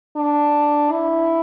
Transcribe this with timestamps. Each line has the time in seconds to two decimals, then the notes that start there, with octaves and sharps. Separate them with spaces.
0.16 D4
0.92 E4